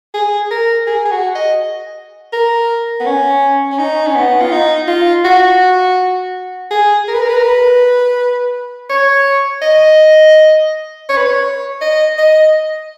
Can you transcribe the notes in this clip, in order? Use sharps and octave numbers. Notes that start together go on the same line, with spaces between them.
G#4
A#4
G#4
G#4
F#4
D#5
A#4
B3
C#4
C#4
D#4
C#4
B3
F4
D#4
F4
F#4
G#4
A#4
B4
A#4
B4
A#4
B4
C#5
D#5
C#5
B4
C#5
D#5
D#5